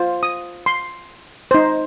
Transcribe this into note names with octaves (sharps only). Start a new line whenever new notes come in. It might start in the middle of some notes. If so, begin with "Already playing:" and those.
Already playing: F4 C5
D#6
C6
D#4 C5